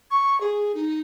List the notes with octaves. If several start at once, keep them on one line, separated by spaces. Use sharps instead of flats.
C#6
G#4
D#4